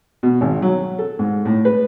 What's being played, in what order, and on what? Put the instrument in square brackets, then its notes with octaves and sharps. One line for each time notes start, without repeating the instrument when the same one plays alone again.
[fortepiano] B2
G#1
F#3
A4
G#2
A2
B4